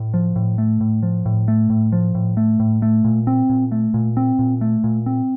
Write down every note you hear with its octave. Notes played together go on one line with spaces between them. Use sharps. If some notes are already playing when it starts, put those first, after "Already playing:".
Already playing: A2
F3
A2
A3
A2
F3
A2
A3
A2
F3
A2
A3
A2
A3
A#2
C4
A#2
A3
A#2
C4
A#2
A3
A#2
C4